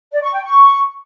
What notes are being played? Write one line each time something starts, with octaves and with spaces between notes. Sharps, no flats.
D5
C#6
G5
C#6